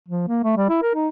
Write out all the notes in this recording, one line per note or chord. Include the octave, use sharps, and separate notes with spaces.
F3
A#3
A3
G3
E4
A#4
D#4